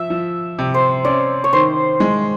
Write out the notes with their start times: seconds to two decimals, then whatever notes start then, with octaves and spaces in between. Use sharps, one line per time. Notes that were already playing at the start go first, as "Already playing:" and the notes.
Already playing: F3 E5
0.10 F3
0.59 C3
0.74 C5
1.05 C#4 D5
1.44 C#5
1.53 D#3 C5
2.00 G#3